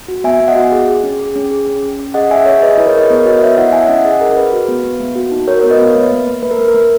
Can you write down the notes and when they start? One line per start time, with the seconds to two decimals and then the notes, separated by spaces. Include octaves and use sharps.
0.08 F#4
0.24 B3 E5 G#5
0.40 B3
0.48 D#5 F#5
0.56 F#4
0.72 G#4
0.87 G#4
1.03 C#4
1.20 G#4
1.36 C#4
1.51 G#4
1.67 C#4
1.83 C#4
1.99 C#4
2.14 G#4 D#5 F#5
2.30 G#4 E5 G#5
2.46 G#4 C#5 E5
2.62 G#4 B4 D#5
2.74 E4 B4 D#5
2.86 A#4 C#5
2.94 G#4 B4 D#5
3.09 B3 A#4 C#5
3.25 F#4 B4 D#5
3.41 B3 C#5 E5
3.57 E4 D#5 F#5
3.73 E4 E5 G#5
3.89 C#4 D#5 F#5
4.04 G#4 D#5 F#5
4.21 G#4 A#4
4.37 G#4 B4
4.53 F#4
4.68 B3
4.83 B3
5.00 A#3
5.15 F#4
5.31 D#4
5.47 F#4 A#4 C#5
5.59 A#4 C#5
5.63 B3
5.71 B4 D#5
5.79 B3
5.95 A#3 B4
6.11 A#3
6.27 A#3
6.42 A#3 B4
6.51 A#4
6.59 A#3
6.68 A#4
6.74 A#3